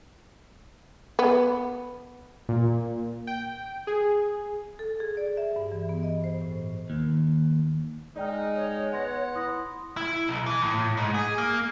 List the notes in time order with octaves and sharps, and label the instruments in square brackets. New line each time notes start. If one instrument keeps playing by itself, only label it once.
[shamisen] B3
[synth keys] A#2
G5
G#4
[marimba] A4
G#4
D5
E5
G2
E3
B3
D#5
C5
A2
[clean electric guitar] D#2
[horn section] G#3 D#4 [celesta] D5 G5 F6
[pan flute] C#5
[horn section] B3 F#5 [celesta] C6 A#6
[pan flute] E4 [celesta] C6 D#6 A#6
[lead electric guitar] E4
B1
E3
A2
G#2
G#4
A#3